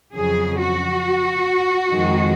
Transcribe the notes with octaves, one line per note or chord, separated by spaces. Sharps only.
F2 C#3 F#3 G#4
F#4
F2 D#3 G#3